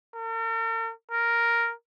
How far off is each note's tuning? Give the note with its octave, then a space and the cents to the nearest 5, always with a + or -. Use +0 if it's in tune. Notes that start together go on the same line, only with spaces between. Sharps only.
A#4 -45
A#4 +0